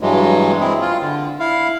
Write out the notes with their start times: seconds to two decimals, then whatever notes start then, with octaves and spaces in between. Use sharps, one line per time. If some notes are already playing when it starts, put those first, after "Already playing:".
0.01 G2 E3 F#3 G#3
0.60 C4 E4 G#4
0.81 F4
1.01 D3
1.40 E4 F5